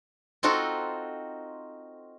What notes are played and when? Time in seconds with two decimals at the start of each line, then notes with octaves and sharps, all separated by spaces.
0.43 C4 D#4 F4 F#4 A4